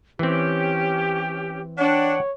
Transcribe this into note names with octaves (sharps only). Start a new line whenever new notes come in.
E3 C4 C#4 G4
D4 C#5 F#5 G5